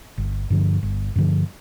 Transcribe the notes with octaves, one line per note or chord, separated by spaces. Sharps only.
G1
G2 D3 F3
G1
G2 D3 F3